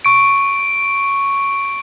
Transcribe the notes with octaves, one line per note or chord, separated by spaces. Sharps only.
C#6 D7